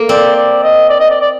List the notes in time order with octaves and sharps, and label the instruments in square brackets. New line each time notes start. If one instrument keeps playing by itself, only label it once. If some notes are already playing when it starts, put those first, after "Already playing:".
Already playing: [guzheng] A#3
[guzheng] C4 [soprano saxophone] D5
[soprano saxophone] D5
D#5
D5
D#5
D5
D5